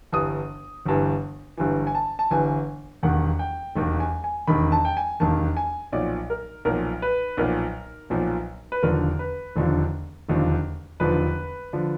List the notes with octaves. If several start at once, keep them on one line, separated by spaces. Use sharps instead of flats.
G1 G2 E3 D#6
G1 G2 E3
G1 G2 E3
G#5
A5
A5
G1 G2 E3 G#5
E1 D#2 D#3 F#5
G5
E1 D#2 D#3
G#5
G#5
E1 D#2 D#3 B5
A5
G5
G#5
E1 D#2 D#3 A5
G#5
B1 A#2 F3 D5
A#4
B1 A#2 F3 A#4
B4
B1 A#2 F3 A#4
B1 A#2 F3
B4
E1 D#2 D3 F3 A#4
B4
E1 D#2 D3 F3
E1 D#2 D3 F3
E1 D#2 D3 F3 B4
D3 F3